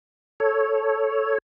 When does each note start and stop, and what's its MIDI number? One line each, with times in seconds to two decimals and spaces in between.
0.40 1.38 69
0.40 1.38 73